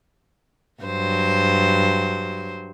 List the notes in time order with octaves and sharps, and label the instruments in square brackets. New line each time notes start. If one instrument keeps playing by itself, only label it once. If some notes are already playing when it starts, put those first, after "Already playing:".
[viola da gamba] G2 F#3 C5